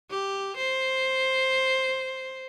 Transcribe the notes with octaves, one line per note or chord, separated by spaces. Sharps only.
G4
C5